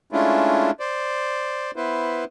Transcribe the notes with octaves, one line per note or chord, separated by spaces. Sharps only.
G#3 A3 C#4 D4 E4 F4
C5 D5
B3 E4 B4 C5